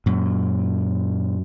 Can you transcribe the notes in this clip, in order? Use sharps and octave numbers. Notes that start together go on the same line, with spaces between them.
F#2 A#2